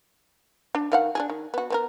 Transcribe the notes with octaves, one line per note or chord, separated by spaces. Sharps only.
D4
D#3 F5 F#5
D4 F4 G#4
D#3
B3 F#4
B3 C4 A#4